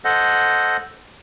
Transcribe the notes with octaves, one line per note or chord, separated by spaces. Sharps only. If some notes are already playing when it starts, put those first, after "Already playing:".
A4 C5 D#5 F#5